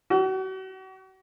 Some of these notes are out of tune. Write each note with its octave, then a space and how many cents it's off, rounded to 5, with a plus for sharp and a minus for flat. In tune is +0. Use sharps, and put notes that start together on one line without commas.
F#4 +40